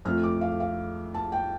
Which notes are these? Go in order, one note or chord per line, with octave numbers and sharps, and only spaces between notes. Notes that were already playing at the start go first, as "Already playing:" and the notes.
F2 F3 A3 F6
D6
F5
F5
A5
G5